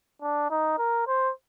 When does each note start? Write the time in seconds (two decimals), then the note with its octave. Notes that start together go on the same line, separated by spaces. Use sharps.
0.22 D4
0.50 D#4
0.79 A#4
1.08 C5